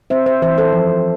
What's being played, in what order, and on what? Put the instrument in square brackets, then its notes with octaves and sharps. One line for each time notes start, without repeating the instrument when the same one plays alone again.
[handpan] C4 C5 E5
C5 E5
E3 C5 E5
A4 C5
F3